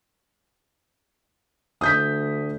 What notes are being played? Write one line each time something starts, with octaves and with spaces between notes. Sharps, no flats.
D2 D#6 G6 B6